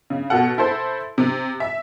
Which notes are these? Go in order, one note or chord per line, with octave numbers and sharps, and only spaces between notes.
C#3
B2 A4 F#5
E4 A4 C5 B5
C3
E5